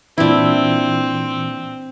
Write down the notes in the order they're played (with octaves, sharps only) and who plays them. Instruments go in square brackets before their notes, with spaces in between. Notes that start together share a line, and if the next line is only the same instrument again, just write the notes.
[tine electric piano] A#2 E3 [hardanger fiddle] C4 [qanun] D4 E4